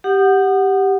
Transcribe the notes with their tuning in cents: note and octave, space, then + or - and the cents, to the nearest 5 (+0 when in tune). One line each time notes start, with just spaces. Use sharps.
G4 +0 F#5 +0 D#6 -35